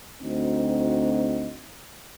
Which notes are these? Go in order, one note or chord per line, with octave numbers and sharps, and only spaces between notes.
D2 C4 D#4 F#4